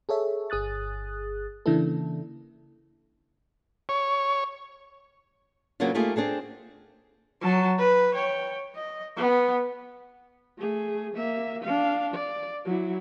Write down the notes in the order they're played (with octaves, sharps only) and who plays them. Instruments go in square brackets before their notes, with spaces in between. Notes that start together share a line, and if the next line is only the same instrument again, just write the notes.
[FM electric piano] G#4 A4 C#5 E5
G1 G#4 D#6 F#6 A6
C#3 E3 A#3 D4 E4 A4
[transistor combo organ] C#5
[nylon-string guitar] C#3 F#3 A#3 B3 D4 F4
A3 A#3 D#4 F4 G4 G#4
C4 D4 G#4 A4
[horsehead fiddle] F#3 A5
B4
C#5 G5
D#5
B3
A3 G#4
A#3 E5
D4 F5
D5
F#3 E4